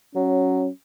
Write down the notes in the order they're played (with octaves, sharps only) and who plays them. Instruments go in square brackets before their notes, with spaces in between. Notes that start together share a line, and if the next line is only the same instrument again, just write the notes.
[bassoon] F#3 [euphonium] C#4